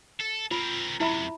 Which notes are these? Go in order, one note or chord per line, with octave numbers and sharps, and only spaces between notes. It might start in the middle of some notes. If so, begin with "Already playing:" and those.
A4
C4 F4 A#4
F#2 C3 E4 E5 B5